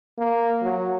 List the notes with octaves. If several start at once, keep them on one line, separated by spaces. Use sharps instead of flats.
A#3
F#3